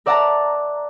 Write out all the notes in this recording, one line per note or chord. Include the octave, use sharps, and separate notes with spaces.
A#4 D5 E5 F#5 A5 A#5